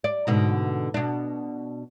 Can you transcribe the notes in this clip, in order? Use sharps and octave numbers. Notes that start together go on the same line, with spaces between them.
D5
G#2 B2 D3
B2 D4